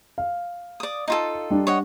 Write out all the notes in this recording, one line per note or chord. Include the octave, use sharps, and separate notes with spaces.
F5
D5 D#6
D#4 F4 A4
G3 D4
C#5 D#5 F#5